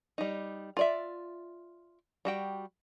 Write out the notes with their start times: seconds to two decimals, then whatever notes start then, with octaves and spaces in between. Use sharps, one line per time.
0.18 G3 D#4
0.77 F4 D5 E5
2.25 G3 F#4 G5